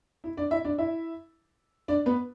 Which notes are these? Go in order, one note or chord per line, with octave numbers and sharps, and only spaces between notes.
E4
D4 D5
E4 E5
D4 D5
E4 E5
D4 D5
B3 B4